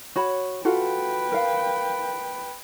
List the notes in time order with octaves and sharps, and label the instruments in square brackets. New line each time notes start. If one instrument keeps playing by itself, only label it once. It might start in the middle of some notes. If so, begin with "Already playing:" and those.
[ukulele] F#4 C#5 B5
[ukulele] F4 F#4 A4 [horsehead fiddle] B4 G5
[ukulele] A#4 F5